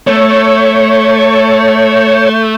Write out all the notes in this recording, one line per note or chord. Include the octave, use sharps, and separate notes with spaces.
A3 C#5